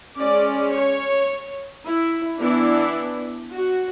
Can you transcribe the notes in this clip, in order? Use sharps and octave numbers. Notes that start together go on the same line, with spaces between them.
G#3 C#4 D5
C#5
E4
E3 B3 D4 E4
F#4